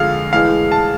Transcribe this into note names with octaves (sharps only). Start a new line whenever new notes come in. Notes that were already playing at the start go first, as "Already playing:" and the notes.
Already playing: F2 D3 F3 G#3 F5
A2 E3 G#3 F5
A5